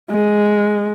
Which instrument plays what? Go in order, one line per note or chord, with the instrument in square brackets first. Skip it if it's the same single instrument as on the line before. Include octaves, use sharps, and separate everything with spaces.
[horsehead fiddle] G#3